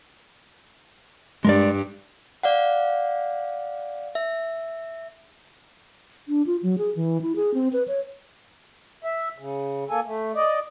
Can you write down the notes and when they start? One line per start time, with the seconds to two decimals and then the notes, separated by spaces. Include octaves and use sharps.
1.45 G2 G3 G#3 A#4 D5
2.43 D5 F5 F#5
4.15 E5
6.28 D4
6.47 F4
6.63 F#3
6.78 G#4
6.96 E3
7.22 E4
7.36 G#4
7.54 C4
7.73 B4
7.88 C#5
9.04 E5
9.38 C#3
9.90 A#3 A4 G#5
10.06 A3
10.35 D5 D#5